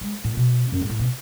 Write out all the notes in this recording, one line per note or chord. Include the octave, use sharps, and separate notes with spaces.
G#3
A2
B2
F#2
G#2
A2
B2